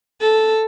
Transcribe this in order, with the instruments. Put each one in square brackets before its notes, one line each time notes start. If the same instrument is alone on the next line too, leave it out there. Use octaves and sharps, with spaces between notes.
[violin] A4